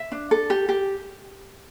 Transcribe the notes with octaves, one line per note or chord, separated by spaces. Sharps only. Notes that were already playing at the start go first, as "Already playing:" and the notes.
Already playing: E5
D4
A4
G4
G4